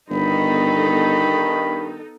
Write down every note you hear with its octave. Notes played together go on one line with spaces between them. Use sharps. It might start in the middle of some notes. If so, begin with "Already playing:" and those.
G1 G2 D#3 B3 D#4 A4 B5